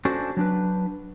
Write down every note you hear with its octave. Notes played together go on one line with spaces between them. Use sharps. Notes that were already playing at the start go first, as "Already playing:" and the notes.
C#4 D4 F#4 A4 C5
F#3 D4 B4